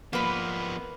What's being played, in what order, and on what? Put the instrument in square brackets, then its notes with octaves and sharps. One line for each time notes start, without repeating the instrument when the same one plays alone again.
[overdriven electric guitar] F3 B3 [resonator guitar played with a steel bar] A#3 B4